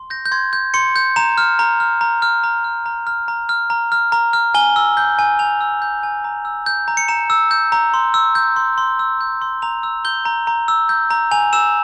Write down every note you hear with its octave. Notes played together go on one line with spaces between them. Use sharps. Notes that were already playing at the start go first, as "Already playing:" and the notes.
Already playing: C6
G6 A#6
G6
C6 G#6
G6
C6 C#7
G6
A#5 E7
F6
A#5
F6
A#5
F6
A#5
F6
A#5
F6
A#5
F6
A#5
F6
A#5
F6
G#5 G7
E6
G6
G#5
G#5 F7
E6
G6
G#5
A#5
E6
G6
A#5
C#7
A#5 E7
E6
G6
A#5
C6
E6
G6
C6
C6
E6
G6
C6
A#5 F7
E6
G6 G7
A#5
A#5
E6
G6
A#5
G#5 F7
E6 E7